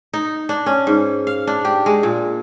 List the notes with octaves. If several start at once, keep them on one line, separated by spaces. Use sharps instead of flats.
D#4
D4
C#4
G#2
F5
D4
G4
G#3
A#2